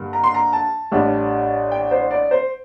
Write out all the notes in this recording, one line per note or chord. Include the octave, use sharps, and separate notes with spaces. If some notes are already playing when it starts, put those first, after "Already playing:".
Already playing: G2 D3 G3 A#3
A#5
C6
A#5
A5
A1 A2 G3 D4
G5
C5
D5
C5